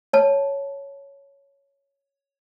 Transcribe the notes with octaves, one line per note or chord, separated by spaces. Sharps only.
C#5 A5